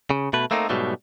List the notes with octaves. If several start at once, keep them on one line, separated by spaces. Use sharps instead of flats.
C#3
B2 A3 B4
A3 A#3 C4 D#4
G#2 B2 F#3 G3 A3